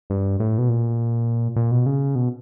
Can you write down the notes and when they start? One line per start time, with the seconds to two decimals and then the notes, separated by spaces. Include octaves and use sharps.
0.10 G2
0.40 A2
0.58 B2
0.69 A#2
1.56 A#2
1.71 B2
1.86 C#3
2.15 B2